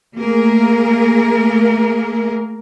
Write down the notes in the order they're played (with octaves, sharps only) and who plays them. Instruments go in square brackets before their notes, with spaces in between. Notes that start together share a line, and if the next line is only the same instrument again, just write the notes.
[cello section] A3 A#3 G#4 A#4